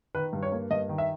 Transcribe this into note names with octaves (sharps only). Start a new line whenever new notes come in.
D#3 B4
G2
C#5
A#3
G2 D#5
D#3
E5